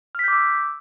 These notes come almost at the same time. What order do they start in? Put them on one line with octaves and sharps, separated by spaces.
F6 B6 G6 D6 E6